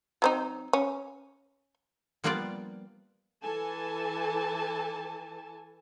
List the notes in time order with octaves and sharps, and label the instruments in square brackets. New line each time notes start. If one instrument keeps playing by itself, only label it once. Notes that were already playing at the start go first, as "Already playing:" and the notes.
[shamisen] F#3 C4 D#4
C#4
[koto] F3 G3 A#3 B3 F4 D5
[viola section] E3 A4 G#5 A5